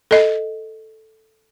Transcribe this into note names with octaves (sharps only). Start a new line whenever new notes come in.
A4 D#5